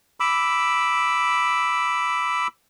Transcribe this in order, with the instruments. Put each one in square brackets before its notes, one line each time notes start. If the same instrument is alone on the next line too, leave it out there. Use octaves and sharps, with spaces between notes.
[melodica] B5 D6 E6